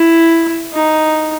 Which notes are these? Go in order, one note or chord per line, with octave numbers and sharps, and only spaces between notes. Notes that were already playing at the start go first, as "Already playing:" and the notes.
Already playing: E4
D#4